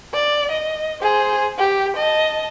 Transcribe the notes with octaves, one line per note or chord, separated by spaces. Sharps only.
D5
D#5
G#4 C5
G4
D#5 A5